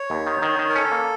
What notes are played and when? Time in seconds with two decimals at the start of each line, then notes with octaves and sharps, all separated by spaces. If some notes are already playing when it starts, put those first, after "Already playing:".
Already playing: C#5
0.10 D#2
0.27 D#3
0.42 D#3
0.59 D#3
0.69 A#4
0.76 C#4 A4
0.92 A#3